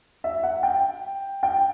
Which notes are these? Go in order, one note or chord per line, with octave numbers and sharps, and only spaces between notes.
E5
F#5
G5
G5